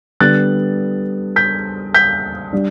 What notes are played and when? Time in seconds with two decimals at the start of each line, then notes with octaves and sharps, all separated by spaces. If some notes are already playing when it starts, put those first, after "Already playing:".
0.20 D3 G3 B3 F#6 A6
1.36 G6 B6
1.94 G6 B6
2.53 G3 D4